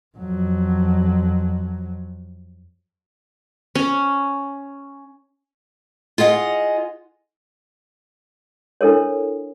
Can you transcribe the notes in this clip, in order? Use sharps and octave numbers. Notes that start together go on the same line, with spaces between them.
F2 F#3
C#4
F4 G#4 D#5 F#5
D4 E4 A4 A#4 C#5